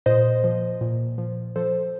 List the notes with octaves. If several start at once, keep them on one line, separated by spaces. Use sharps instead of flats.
A#2 C5 D#5
F3
A#2
F3
F3 A4 C5